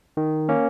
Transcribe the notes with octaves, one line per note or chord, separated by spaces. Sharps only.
D#3
A#3 C#4